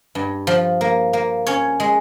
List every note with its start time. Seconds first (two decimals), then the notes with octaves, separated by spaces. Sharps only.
0.15 G2
0.47 F3
0.81 A#3
1.13 A#3
1.47 C#4 C#5
1.80 G#3